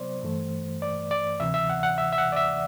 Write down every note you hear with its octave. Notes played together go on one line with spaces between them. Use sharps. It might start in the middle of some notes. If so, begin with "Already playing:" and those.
Already playing: C3 F#3 B3 C5 D5
G2 E3 A3
D5
D5
D2 C3 E3 E5
E5
F#5
F#5
E5
E5
F#5
D5
E5